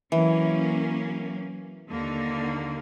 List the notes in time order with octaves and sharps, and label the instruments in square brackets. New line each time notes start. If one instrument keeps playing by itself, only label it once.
[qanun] E3 [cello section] F#3 A#3 C#4
[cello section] D#2 D3 A#3